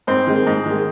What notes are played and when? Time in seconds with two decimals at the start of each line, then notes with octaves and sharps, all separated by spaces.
0.07 G#2 C4 C5
0.27 D#3 G#3
0.47 G#2
0.66 D#3
0.71 G#3